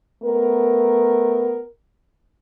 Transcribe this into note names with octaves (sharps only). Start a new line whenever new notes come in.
A3 B3 A#4